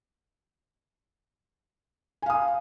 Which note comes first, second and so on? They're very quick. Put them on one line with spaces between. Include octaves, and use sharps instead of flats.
G#5 F5 D#6